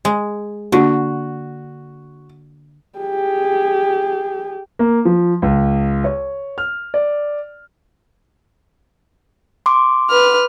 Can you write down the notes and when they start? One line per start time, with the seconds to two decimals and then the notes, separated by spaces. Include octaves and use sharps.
0.05 G#3
0.72 D3 A#3 D4 F#4
2.98 G4 G#4
4.79 A#3
5.05 F3
5.42 C#2
6.04 C#5
6.58 F6
6.94 D5
9.66 C6 D6
10.10 B4 F6